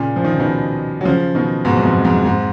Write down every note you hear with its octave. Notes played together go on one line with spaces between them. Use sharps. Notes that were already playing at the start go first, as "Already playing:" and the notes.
Already playing: A#2 C#3
F3
D#3
C#3
B2 D#3
F#3
C#3 F3
B2 D#3
G#2 B2
F#2
F2 G#2
F2 G#2
F2 G#2